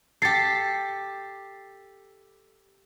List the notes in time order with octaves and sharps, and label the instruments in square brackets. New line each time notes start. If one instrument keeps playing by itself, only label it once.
[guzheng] G4 A4 [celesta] A6 C7